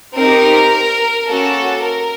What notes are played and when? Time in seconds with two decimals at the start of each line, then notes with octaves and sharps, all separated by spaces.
0.18 C4 D#4 G4 A#4
1.28 A#3 C#4 F#4 A4
1.84 A#4